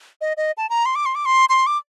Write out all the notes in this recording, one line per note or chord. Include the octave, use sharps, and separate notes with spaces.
D#5
D#5
A5
A#5
C6
D6
C6
D6
C6
C6
D6